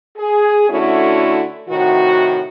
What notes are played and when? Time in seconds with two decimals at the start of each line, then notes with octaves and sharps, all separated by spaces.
0.17 G#4
0.70 D3 A3 C#4 E4 F#4
1.70 A2 C3 D#3 F#4